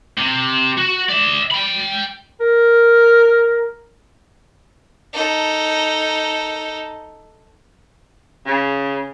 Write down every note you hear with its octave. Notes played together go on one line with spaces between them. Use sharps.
C3
F#4
D5 E5
G5 B5
A#4
D#4 A4
C#3